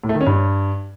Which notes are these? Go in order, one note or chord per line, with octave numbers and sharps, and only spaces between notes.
A2
A3
D#3
C#4
G2